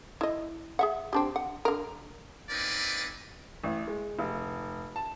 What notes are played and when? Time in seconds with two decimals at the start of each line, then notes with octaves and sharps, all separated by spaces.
0.21 E4 D#5
0.79 G#4 E5 F#5
1.13 C4 D4 G4
1.36 F#5
1.65 D3 A#4
2.50 A#3 C4 C#4 D#4 B4 D5
3.64 A1
3.88 G#3
4.19 F1
4.96 A5